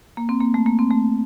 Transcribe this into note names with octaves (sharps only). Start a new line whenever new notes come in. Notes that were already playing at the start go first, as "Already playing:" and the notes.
A#3
C4
A#3
A3
A#3
C4
A3